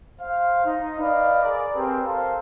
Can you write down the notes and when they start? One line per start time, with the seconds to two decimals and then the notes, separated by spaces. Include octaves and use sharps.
0.20 C5 F5
0.65 D#4
1.00 B4 D5 D#5 F5
1.43 G#4 A#4 D5
1.74 C4 G4 G#4 A#4 B4
2.04 A4 A#4 C5 F5